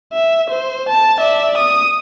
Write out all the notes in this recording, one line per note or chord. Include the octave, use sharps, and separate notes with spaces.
E5
C5
A5
D5 E5
D#6